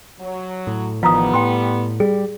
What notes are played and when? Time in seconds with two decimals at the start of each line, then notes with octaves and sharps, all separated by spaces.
0.20 F#3
0.67 A2
1.03 A1 D#3 F3 G3 B3 F5 A#5 D#6
1.34 A2 G5 C6
2.00 G3 G#4